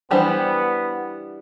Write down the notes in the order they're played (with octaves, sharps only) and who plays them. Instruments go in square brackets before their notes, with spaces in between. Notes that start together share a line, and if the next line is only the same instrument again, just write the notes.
[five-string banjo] E3 G3 D4 G4 C5 [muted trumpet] B3